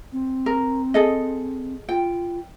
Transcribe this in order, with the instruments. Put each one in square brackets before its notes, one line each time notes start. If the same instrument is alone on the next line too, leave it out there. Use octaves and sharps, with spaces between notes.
[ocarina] C4
[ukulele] A#4
G#4 A4 D#5
[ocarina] F4 [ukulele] G5